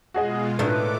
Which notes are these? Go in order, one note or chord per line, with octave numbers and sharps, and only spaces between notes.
B2 G#3 F4 F#4 G#4 D#5
A2 D#3 A3 D4 D#4 A4 B4 D6